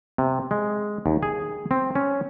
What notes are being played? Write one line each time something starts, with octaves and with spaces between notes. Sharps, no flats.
C3
G#3
D#2
G#4
C4
C#4